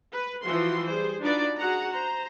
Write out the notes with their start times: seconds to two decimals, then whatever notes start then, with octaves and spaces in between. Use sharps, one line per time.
0.12 B4
0.43 E3 F3 F#4 C6
0.88 G3 G#4 C5
1.21 D4 D#4 F4 F#4 B4 D5
1.58 F#4 G#4 F#5 A#5
1.92 C5 A#5